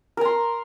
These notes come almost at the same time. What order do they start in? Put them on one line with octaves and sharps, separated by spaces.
A#4 A#5 C6